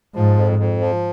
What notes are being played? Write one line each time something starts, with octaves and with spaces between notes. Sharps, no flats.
G#2 F3
F2
F2
F3